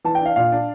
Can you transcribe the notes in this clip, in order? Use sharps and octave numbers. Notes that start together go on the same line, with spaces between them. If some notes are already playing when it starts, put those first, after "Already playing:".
E3 A5
G5
D4 F5
A#2 F5
D4